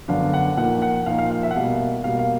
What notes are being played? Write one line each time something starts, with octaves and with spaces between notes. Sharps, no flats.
F#2 D3 F#3 B3 D4 F5
F#5
A#2 F3 A#3 D#4 F#5
F#5
A#2 F3 A#3 D#4 F5
F5
F5
E5
F#5
B2 G3 A#3 F5
B2 G3 A#3 F5
F5